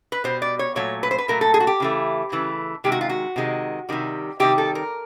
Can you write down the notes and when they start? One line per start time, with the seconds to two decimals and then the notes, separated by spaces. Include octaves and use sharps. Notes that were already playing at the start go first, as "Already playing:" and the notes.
0.12 B4
0.24 B2 G3 C5
0.42 D5
0.59 C#5
0.76 A#2 F#3 A3 C#5
1.03 B4
1.11 C5
1.18 B4
1.28 A#2 F#3 A3 A#4
1.41 A4
1.54 G#4
1.60 F#4
1.67 G4
1.80 C#3 E3 A3
2.32 C#3 E3 A3
2.84 C3 D#3 G#3 G4
2.92 F#4
3.01 F4
3.09 F#4
3.36 C3 D#3 G#3
3.89 C3 D#3 G3
4.40 C3 D#3 G3 G4
4.58 A4
4.75 A#4